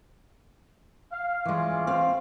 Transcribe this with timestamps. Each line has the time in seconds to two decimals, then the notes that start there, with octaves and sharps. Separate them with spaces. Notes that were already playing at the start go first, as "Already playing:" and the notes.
1.11 F5
1.45 E3 G#3 C#4 F4 D6
1.87 C4 F5